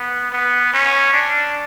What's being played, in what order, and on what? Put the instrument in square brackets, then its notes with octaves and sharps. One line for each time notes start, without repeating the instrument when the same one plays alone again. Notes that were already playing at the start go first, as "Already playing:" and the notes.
Already playing: [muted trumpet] B3
B3
C#4
D4